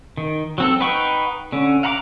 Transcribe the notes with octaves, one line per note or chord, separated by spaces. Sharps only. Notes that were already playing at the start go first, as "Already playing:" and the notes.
D#3
F#3 C4 A4
D#4 B4 F#5 G5 C#6
D3 C#4
F5 F#5 A#5 B5 D6